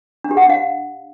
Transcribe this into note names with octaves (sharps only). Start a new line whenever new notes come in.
D4
G4
F#5
D4
F5